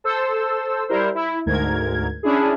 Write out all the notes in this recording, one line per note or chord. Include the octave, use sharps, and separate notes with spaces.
A4 C5 E6
G3 E4 A#4 C5
E4
D2 G#2 A#4 G#6
C#4 D4 E4 G#4